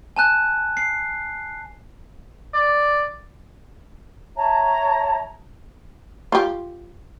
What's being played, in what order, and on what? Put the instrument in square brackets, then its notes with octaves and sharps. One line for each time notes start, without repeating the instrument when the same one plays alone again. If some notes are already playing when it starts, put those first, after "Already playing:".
[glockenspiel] G#5 A5 F#6
C7
[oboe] D5
[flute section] C#5 E5 A5 A#5
[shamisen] F4 G4